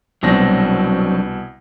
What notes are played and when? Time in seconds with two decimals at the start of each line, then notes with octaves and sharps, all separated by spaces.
0.23 C2 B2 F#3 C4 D4 A#6